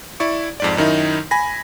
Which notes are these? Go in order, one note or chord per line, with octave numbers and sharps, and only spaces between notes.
E4 D5 C#6
F2 G#2 D5
F#2 D#3 D#4 E4
G#5 B5 A#6